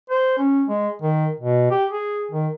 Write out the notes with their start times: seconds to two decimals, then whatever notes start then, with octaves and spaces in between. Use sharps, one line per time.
0.10 C5
0.38 C#4
0.68 G#3
1.02 D#3
1.40 B2
1.71 G4
1.90 G#4
2.32 D#3